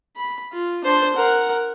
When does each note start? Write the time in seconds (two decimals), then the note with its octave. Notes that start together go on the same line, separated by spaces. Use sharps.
0.16 B5
0.53 F4
0.84 D4 C5
1.16 A#4 F#5